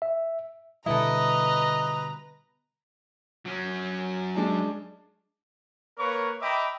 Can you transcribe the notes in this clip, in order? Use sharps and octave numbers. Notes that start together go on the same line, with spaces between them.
E5
B2 D3 G3 E4 A4 B4 D#5 A#5
F#3 C#4
G#3 D4 A5
A#3 A#4 B4 C#5 C#6
D#5 E5 G5 A#5 B5 D6